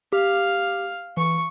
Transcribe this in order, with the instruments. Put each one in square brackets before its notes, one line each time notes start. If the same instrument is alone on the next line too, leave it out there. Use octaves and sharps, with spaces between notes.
[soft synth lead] G4 [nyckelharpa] F5
[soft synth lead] E3 [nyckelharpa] C#6